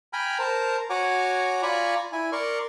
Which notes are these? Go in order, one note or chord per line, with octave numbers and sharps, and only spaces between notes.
G5 G#5 A#5 B5 F6
A#4 C5 A5 A#5
F#4 C#5 F#5 G#5 A#5 D6
F4 D5 G#5 A#5 B5 C#6
E4 G#5
A#4 D5 C6 C#6